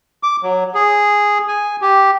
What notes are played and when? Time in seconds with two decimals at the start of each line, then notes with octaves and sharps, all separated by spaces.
0.23 D6
0.43 F#3
0.75 G#4
1.48 G#5
1.82 G4